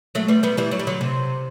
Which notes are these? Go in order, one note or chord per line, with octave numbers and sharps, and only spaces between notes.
F#3 A3
G3 B3
G3 B3
E3 G3
F#3
G3
D3 F#3
C3